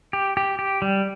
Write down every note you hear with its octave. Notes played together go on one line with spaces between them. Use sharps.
G4
G4
G4
G3